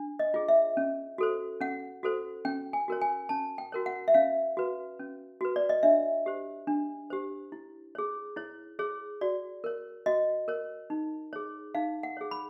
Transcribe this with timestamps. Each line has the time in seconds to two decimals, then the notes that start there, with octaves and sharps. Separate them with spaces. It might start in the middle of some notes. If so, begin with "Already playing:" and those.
Already playing: D4
0.19 D#5
0.34 F4 G#4
0.48 E5
0.77 C#4
1.18 F#4 A4 C5
1.61 C#4 F#5
2.03 F#4 A4 C5
2.45 C#4 G5
2.73 G#5
2.88 F#4 A#4 C#5
3.01 G#5
3.29 C#4 A5
3.58 G5
3.72 F#4 A#4 C#5
3.86 F#5
4.08 E5
4.14 C#4 F5
4.57 F#4 B4
4.99 C#4
5.41 F#4 B4
5.56 D5
5.69 D#5
5.83 D4 E5
6.26 G4 C5
6.67 D4
7.10 G4 C5
7.52 E4
7.95 G#4 C#5
8.36 E4 C#5
8.79 G#4 C#5
9.21 F#4 D5
9.64 A#4 C#5
10.06 F#4 D#5
10.48 A#4 C#5
10.90 D#4
11.33 G#4 C#5
11.75 D#4 F5
12.03 F#5
12.17 G#4 C#5
12.31 B5